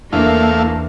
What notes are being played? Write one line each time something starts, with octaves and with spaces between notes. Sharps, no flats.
E2 A3 A#3 D4 E4 D5 F5